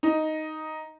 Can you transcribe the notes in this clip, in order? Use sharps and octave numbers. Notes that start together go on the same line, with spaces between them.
D#4